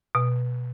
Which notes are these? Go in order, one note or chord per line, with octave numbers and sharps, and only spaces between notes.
B2